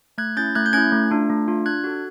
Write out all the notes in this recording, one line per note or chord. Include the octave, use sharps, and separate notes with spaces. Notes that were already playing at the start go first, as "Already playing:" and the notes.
A3 F#6 G#6
C#4 E4 G6 A6
A3 F#6 G#6
G6
C#4 E4 F#6 G#6
A3
D4 F4
A3
D4 F4
D4 F#6 G#6
F#4 A4